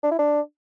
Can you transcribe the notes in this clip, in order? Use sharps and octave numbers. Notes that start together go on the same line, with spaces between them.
D4
E4
D4